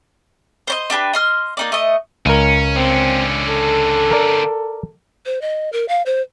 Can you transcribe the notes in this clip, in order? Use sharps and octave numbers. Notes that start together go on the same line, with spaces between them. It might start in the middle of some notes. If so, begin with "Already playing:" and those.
C5 C#5 D#5
D4 G4 G#4 B4
D#5 C6 F6
A#3 D#4 D5
A3 D#5
C#2 C#4 A#4
D3 C4 C#4
A4
A#4 D5
C5
D#5
A#4
F5
C5